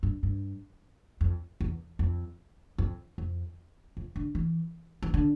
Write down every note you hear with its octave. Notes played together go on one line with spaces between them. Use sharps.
G2
G2
F2
E2
F2
F2
F2
F2
D3
E3
E3
D3